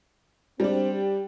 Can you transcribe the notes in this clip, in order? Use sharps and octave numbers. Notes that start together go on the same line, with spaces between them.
G3 C4 D4
G4